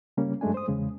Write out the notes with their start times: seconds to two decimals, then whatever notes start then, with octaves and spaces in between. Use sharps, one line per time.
0.17 C#3 G3 A#3 C#4
0.41 G2 F#3 G#3 A3 D4 G#5
0.54 C5 D#6
0.68 E2 C#3 G#3